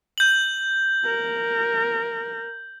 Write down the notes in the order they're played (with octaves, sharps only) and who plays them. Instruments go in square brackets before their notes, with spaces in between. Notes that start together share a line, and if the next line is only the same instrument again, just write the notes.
[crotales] G6 F#7
[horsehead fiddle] A#4